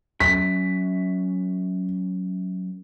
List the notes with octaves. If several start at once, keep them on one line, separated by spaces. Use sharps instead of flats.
F#2 B6